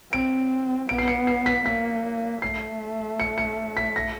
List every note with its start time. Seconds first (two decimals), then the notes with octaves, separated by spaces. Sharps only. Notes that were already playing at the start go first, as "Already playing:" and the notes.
0.12 C4 D7
0.89 B3 D7
0.98 C7
1.08 C#7
1.27 C7
1.46 B6
1.65 A#3 B6
2.42 A3 C7
3.20 C#7
3.38 C#7
3.77 B6
3.96 A#6